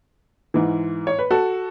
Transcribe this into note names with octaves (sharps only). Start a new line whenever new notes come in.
G#2 E3
C#5
B4
F#4 A4